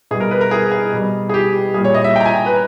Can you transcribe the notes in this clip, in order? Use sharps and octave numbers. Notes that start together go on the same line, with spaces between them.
B2 G3 G#4
A#4
B4
A#4
G#4
G#4
B2 G3
G#4
G4
A#2 G3 G#4
C#5
D#5
E5
G5
A#5
G#5
B4